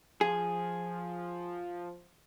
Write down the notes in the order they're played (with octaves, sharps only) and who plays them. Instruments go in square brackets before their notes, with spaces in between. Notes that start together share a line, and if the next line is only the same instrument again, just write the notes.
[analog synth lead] F3 [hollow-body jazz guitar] G#4